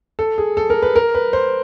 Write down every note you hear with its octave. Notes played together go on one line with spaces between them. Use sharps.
A4
G#4
A4
A#4
B4
A#4
B4
C5